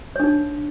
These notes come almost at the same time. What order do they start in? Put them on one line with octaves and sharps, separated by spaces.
C#5 D4 D#4